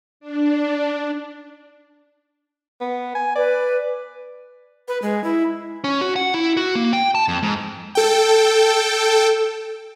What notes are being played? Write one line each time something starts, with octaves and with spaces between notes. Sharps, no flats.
D4
B3
G#5
B4 D5
B4
G#3
E4
C#4
F#4
F#5
E4
F#4
A#3
G5
A5
F2
G#2
A4 G5